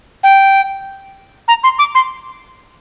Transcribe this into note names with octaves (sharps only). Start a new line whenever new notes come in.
G5
A#5
C6
D6
C6